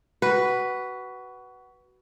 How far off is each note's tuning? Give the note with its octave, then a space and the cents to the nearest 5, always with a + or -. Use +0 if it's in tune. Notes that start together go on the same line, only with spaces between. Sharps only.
F#4 +20 B4 +0